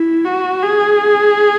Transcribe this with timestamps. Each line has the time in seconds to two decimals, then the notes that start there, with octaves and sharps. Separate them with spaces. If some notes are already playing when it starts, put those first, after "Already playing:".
Already playing: E4
0.25 F#4
0.63 G#4